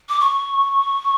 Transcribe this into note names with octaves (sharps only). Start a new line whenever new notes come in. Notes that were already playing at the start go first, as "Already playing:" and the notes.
D6
C#6